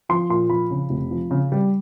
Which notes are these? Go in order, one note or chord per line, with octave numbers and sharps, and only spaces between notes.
F3 C6
A#2 C6
F3 B5
C#3
F1
F3
C#3
G3